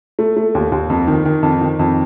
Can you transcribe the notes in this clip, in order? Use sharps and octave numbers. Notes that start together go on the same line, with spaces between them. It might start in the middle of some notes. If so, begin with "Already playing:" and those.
A3
A3
D#2
D#2
F2
D#3
D#3
F2
D#3
F2